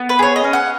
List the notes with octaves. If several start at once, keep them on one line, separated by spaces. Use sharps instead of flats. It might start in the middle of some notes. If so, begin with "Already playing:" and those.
Already playing: B3
B4
G#4 C#5
D#5
C#4
F#5